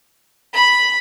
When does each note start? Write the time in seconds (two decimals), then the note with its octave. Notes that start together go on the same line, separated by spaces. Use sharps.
0.55 B5